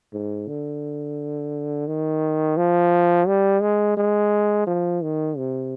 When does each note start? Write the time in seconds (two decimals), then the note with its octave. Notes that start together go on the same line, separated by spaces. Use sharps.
0.13 G#2
0.48 D3
1.88 D#3
2.57 F3
3.27 G3
3.62 G#3
3.97 G#3
4.67 F3
5.02 D#3
5.37 C3